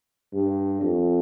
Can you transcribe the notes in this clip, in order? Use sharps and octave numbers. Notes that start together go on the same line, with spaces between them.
G2
F2